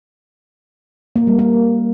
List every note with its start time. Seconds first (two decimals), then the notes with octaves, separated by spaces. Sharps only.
1.16 A#3
1.27 G3
1.39 A#3